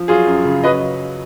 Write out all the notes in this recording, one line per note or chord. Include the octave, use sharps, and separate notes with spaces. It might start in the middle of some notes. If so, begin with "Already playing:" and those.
Already playing: F3
F#3 F4 G#4
F#2
C#3
F#3 B4 D#5